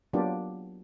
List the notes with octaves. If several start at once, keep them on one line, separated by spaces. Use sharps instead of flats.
F#3 A#3 B3 D4 F4 G4